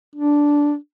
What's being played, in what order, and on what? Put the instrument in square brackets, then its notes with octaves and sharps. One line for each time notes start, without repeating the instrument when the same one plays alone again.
[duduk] D4